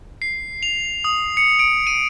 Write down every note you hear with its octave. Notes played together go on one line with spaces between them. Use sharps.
C7
F7
D#6
C#7
D7
D#7